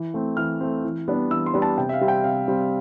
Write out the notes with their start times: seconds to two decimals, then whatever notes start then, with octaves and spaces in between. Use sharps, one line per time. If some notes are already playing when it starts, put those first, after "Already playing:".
Already playing: E3
0.14 A3 C4
0.37 E3 F6
0.60 A3 C4
0.84 E3
1.08 G3 B3 D4
1.31 E3 E6
1.46 C6
1.54 G3 B3 D4
1.62 A5
1.78 C3 G5
1.89 E5
1.94 F5
2.01 G3 C4
2.08 G5
2.24 C3 F5
2.48 G3 C4